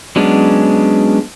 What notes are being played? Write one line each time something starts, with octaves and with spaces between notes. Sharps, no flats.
F#3 G#3 B3 C#4 D4